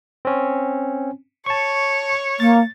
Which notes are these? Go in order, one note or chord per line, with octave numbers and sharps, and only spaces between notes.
C4 C#4
C#5 A5 C#6
A#3 A6